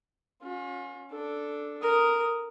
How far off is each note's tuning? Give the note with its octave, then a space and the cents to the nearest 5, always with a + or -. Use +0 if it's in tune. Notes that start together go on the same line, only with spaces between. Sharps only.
C#4 +0 F4 +45
D4 +0 A4 +0
A#4 +0 D#6 +0